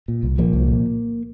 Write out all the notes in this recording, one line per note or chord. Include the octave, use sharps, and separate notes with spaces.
A#2
C2
A#2 F3 A#3
C2
A#2